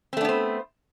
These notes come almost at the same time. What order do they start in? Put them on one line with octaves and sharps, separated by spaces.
C4 A3 D4 B3 C5